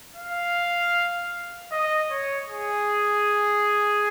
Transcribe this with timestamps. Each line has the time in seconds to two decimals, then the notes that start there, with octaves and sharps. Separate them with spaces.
0.16 F5
1.72 D#5
2.11 C#5
2.49 G#4